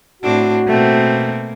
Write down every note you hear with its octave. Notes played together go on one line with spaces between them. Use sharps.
A2 C4 D4 F#4
B2 A3 A#3 C4